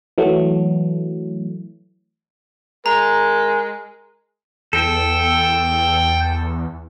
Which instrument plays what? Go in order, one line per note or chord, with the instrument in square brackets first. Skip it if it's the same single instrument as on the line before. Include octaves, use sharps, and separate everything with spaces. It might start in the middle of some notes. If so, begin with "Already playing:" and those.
[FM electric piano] E3 F#3 A3
[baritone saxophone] G#3 [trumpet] A#4 [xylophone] A#5
[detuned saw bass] E2 [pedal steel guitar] A4 [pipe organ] G5